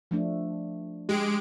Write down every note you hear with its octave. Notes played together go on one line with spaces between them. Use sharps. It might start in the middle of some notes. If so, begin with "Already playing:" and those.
F3 A3 D4
G#3 G4 D7